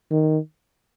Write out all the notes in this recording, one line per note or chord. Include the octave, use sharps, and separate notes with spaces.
D#3